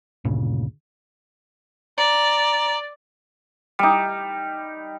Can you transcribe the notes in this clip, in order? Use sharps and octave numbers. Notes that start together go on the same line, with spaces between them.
D2 G2 A#2 C#3
D5 A#5
G3 D#4